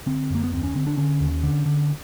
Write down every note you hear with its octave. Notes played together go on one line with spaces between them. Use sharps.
D3 C4
F#2 A#3
B3
D#2 C4
C#4
D3 C4
D4
D3 C#4
D#2
D3
D3